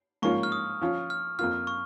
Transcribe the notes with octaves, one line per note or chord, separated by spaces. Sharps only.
G#2 F3 A#3 C#4 F4 C#6
F6
D#6
F3 C#4 F4
F6
F2 F3 A#3 F4 F6
C#6